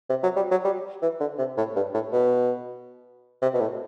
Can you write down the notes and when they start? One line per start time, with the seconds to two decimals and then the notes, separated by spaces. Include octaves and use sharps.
0.10 C3
0.23 F#3
0.36 G3
0.51 F#3
0.65 G3
1.02 E3
1.20 D3
1.38 C3
1.57 A2
1.76 G2
1.94 A2
2.12 B2
3.42 C3
3.54 B2
3.61 A2